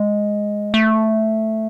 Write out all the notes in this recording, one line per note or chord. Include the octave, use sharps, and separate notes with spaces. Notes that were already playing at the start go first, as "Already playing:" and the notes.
Already playing: G#3
A3